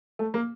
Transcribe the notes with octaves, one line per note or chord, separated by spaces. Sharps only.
A3
A#3